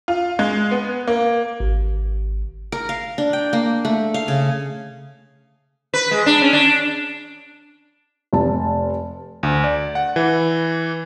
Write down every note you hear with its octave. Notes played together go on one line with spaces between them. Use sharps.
F4
G#3
B3
A#3
G#1
A#4
F5
D4
G5
A#3
A3
F5
C#3
B4
G#3
D4
C#4
D4
F1 A5
D2
D5
F#5
E3